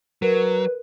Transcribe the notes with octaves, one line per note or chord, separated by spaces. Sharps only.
F#3 A#4 B4